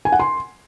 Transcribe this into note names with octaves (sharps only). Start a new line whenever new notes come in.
G#5
F#5
C6